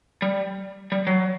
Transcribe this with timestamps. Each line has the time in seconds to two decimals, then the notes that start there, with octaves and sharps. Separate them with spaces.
0.22 G3
0.92 G3
1.07 F#3